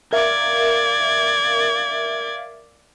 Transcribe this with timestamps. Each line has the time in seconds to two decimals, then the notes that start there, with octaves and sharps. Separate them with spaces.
0.13 A#4 D5 E5 F5 G#6